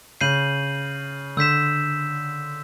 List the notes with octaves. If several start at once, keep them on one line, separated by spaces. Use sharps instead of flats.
C#3 G6 C7 D#7 F#7
D3 E6 G6 B6 E7